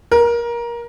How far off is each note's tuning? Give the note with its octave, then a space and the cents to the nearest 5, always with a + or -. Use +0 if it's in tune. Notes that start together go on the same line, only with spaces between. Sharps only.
A#4 +20